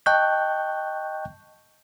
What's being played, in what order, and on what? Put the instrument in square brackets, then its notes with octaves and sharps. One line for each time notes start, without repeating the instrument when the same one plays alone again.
[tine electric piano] D#5 G5 A5 C#6 F#6 G6